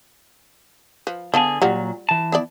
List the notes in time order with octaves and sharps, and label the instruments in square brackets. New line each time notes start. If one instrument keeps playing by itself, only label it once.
[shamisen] F3 B4
[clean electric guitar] D3 G#4 [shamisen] B3 F5 A5
[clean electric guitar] A#2 F#3 [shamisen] G3 F4 F#5
[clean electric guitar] E3 A5
[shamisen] B3 E4 D5